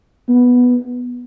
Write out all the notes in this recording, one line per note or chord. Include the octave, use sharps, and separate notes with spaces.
B3